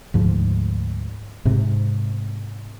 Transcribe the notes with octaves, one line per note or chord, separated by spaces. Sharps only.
D2 G#2 F3
G#2 C3